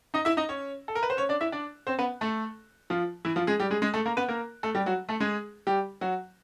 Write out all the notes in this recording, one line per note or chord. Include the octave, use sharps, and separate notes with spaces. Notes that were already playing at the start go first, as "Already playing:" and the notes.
D#4 D#5
E4 E5
D#4 D#5
C#4 C#5
A4
A#4
B4
C5
C#4 C#5
D4 D5
E4 E5
D4 D5
C4 C5
B3 B4
A3 A4
F3 F4
E3 E4
F3 F4
G#3 G#4
G3 G4
G#3 G#4
G#3 G#4
A3 A4
A#3 A#4
B3 B4
A#3 A#4
A3 A4
G3 G4
F#3 F#4
A3 A4
G#3 G#4
G3 G4
F#3 F#4